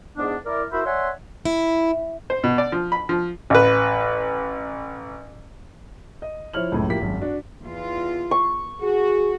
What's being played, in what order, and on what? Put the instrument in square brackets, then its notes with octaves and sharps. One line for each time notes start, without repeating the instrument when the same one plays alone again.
[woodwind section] E2 G#2 B3 D4
E4 A#4 D5
E4 F#4 A#4 C5 E5 B5
C#5 D5 E5 F#5 G#5 C6
[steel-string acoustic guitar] E4
[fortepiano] C5
B2
D5
F3
B5
F3
A1 B4
[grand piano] D#5
F3 E4 C5 C#5 F6 F#7
C#2 F#2 A2
D1 F3 A#3 E4 G4 B6
G#1 F#2
D4 F#4
[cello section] E2 F4
[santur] C#6
[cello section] F#4 [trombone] G#4